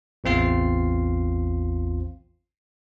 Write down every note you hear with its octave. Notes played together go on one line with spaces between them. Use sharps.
A1 E2 C4 F4 C7